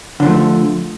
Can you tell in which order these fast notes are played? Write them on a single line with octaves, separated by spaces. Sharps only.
D3 F3 A3